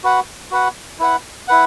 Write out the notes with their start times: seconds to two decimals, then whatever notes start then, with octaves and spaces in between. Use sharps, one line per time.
0.04 F#4 B4 F#5
0.51 F#4 B4 F#5
0.99 E4 B4 F#5
1.48 E4 B4 F#5